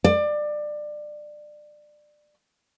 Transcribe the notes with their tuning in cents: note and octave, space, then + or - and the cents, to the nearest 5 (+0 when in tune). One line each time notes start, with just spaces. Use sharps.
D5 +25